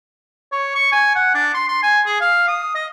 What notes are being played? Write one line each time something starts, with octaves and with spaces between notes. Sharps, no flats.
C#5
C#6
G#5
F#5
D4
C6
C6
G#5
G#4
F5
D#6
D#5